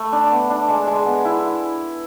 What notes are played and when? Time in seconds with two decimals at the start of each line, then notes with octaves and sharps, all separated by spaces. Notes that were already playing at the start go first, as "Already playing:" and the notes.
Already playing: A3 B5
0.13 D4
0.31 B3
0.50 D4
0.69 G#3 A5
0.87 G#3
1.06 B3
1.25 E4